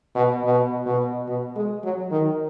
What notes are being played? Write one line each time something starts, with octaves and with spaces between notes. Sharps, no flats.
B2
B2
B2
B2
G#3
F#3
D#3